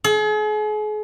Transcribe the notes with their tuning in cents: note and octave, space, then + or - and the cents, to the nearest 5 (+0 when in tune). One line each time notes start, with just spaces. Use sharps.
G#4 +40